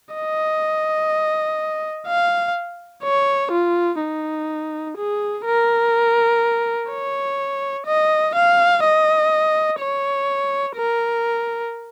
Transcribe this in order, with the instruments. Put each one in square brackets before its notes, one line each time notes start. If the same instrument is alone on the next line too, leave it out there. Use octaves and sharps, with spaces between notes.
[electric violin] D#5
F5
C#5
F4
D#4
G#4
A#4
C#5
D#5
F5
D#5
C#5
A#4